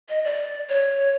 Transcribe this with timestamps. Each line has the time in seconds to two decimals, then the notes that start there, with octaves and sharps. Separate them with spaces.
0.09 D#5
0.25 D5
0.69 C#5